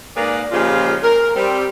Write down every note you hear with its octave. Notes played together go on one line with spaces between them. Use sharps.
G#2 A#3 G#4 B4 D5
A#2 C#3 F3 G#3 F4 G4
A#4
G3 C4